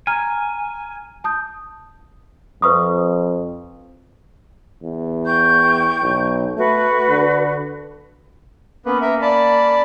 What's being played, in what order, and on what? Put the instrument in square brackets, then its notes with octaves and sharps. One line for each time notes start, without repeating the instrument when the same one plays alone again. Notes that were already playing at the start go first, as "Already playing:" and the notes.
[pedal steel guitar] G#5 [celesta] A#5 F6
[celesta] A5 D#6 G6
[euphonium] F2 [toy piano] B4 C#6 D#6
[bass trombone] E2
[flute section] G5 C#6 G6
[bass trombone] B1
[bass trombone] A3 [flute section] F#4 B4
[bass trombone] D3
[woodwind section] A#3 C#4 [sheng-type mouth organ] B3 B4
[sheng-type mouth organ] A#4 E5
D5 A5 B5